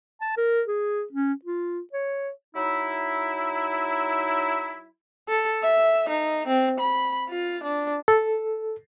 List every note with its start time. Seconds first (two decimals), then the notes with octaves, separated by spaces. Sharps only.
0.21 A5
0.37 A#4
0.68 G#4
1.13 C#4
1.45 F4
1.93 C#5
2.55 F#3 D#4 E4
5.29 A4
5.63 E5
6.09 D#4
6.47 C4
6.80 B5
7.29 F4
7.63 D4
8.08 A4